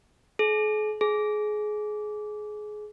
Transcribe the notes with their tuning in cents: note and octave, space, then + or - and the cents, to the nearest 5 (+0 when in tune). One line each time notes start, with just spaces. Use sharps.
G#4 +45
G#4 +25